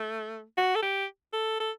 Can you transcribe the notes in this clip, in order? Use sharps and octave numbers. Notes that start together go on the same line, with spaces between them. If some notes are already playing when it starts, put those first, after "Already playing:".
Already playing: A3
F#4
A4
G4
A4
A4